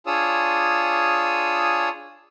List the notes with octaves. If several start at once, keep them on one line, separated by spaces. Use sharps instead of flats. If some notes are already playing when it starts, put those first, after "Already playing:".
D4 F4 G#4 C#5 D#6 E6